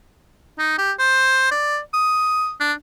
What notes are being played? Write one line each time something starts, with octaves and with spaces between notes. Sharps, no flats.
D#4
G4
C5
D5
D#6
D4